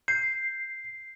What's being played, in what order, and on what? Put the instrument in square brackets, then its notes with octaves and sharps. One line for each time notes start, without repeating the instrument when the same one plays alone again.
[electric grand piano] G6 [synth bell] C7